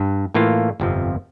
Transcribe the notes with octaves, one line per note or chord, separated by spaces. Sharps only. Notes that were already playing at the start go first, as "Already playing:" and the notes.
Already playing: G2
A2 E3 A#3 F4
G1 F2 C3 F3